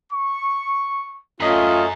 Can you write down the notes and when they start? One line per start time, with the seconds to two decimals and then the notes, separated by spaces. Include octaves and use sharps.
0.12 C#6
1.40 F#2 A3 C#4 F4 D#5